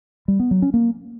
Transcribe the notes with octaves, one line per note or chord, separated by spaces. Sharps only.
G3
B3
F#3
C#4
A#3